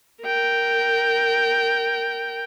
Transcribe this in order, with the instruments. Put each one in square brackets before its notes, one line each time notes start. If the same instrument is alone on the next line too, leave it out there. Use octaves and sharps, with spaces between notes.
[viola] A#4 G5